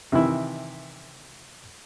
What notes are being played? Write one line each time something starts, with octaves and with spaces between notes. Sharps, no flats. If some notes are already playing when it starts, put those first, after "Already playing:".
C3 D#3 E3 E4